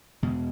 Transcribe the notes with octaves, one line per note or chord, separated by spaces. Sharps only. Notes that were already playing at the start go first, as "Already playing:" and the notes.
E2 B2 G#3